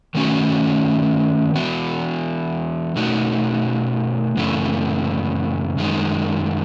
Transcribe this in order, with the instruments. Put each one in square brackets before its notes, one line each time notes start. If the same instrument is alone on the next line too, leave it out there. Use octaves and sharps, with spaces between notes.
[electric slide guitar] D#3 A3 C#4 F#4
E3 B3 F#4
B2 A3 D#4 F#4
F#2 C#3 E3 A3
F#2 D#3 G#3